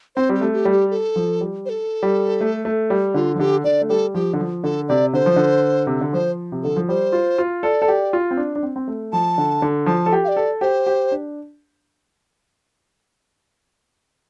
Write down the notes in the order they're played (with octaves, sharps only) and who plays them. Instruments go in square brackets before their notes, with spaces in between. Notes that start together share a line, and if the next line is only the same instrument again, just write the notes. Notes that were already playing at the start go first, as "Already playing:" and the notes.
[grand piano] C4 [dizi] C5
[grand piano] G3
[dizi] G4
[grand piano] A3
[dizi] G4
[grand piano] G3
[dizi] G4
A4
[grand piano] F3
G3
[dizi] C5
A4
[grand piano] G3
A3
A3
G3
[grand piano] D3 [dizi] F4
[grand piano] F3
[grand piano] D3 [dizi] G4
[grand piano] D3 [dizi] D5
[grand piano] A3
[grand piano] G3 [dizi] A4
[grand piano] F3 [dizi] G4
[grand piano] D3
F3
[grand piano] D3 [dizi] A4
[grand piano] C3 [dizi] D5
[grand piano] D3 [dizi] C5
[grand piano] F3
D3
C3
D3
[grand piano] F3 [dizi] C5
[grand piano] C3
[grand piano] D3 [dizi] A4
[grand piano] F3
[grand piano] G3 [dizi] C5
[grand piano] F4
F4
[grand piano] A4 [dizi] D5
[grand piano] A4
G4
F4
C4
D4
D4
C4
C4
A3
[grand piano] F3 [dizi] A5
[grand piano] D3
D3
[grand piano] F3 [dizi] A5
[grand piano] A4
G4
[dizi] F5
D5
[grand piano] A4
[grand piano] G4 [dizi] C5
[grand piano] G4
D4